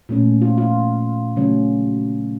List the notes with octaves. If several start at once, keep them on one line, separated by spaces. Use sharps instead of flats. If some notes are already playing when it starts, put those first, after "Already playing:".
A#2 A3 C#4
F4
F4
C#3 F#3 A3 C#4